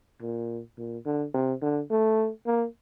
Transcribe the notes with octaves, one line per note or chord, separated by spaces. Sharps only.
A#2
A#2
D3
C3
D3
A3
A#3